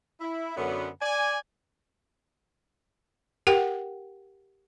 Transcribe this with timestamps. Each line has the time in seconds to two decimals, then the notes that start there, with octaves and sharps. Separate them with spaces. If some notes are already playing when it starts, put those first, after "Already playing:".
0.21 E4
0.57 F#2 D3 B3
1.02 D5 G#5
3.47 G4 A#4 F#5 G5